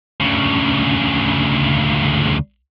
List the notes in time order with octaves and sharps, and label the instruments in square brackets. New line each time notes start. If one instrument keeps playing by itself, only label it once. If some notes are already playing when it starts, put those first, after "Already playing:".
[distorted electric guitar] D2 C#3